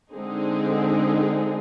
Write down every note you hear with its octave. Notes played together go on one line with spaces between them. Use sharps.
D3 G#3 C4 D#4 G#4